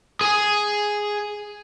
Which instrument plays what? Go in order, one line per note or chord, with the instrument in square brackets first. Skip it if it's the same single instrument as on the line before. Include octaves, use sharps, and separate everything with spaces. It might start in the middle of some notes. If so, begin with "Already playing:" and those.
[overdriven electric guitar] G#4 G#5